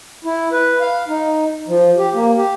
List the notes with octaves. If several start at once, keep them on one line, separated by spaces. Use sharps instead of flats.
E4
B4
F5
D#4
F3
G4
A#3
G4